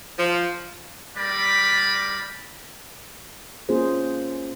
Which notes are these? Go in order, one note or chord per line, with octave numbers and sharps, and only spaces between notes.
F3
G3 A#4 D5 B5
A#3 C#4 F4 G#4 C5